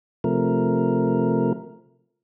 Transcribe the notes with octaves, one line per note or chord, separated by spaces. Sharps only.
C3 F3 A3 A#4